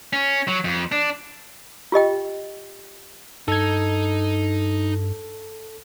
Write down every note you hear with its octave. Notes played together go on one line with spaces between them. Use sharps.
C#4
F#3
F2
D4
F4 G4 D#5 G5
G2 D#4 A4 G#6